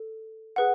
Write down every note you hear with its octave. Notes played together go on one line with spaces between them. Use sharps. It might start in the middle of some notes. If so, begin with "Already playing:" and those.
Already playing: A4
G#4 B4 F#5